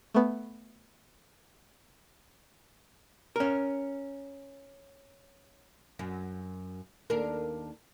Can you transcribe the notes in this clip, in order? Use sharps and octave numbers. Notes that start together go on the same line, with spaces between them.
A3 B3
C#4 A#4
F#2
D#2 D4 A#4